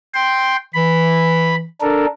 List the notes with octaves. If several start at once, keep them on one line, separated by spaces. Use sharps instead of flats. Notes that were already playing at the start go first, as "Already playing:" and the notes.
G5 C6
E3 B5
D4 A4 A#4